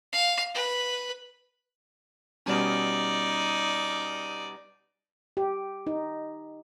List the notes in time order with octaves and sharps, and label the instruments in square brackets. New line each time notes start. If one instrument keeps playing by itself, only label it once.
[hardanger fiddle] F5
B4
[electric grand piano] B2 G3 C#4 [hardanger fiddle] D#4 D5
[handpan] G4
D#4